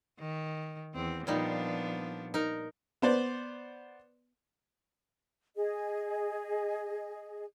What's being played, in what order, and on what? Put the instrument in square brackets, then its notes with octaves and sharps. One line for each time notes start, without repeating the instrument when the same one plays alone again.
[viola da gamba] D#3
E2 C4
[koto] A#2 G3 D#4 [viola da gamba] F3 B3 D4
[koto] D#4 A#4
[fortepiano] B3 C5 D5
[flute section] G#4 D#5